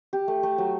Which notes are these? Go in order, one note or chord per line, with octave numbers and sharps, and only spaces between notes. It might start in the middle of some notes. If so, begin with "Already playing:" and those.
G4
A3
A3
F#3